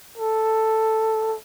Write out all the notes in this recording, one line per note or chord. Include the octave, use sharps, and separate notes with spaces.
A4